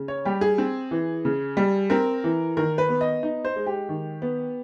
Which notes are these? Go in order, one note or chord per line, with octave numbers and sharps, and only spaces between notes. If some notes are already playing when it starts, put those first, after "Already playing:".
Already playing: C#3
C#5
G3 G4
G#4
C4
E3
C#3
G3
C4 A#4
E3
D#3 A#4
B4
B3
D#5
D#4
C5
G#3
G4
D#3
B3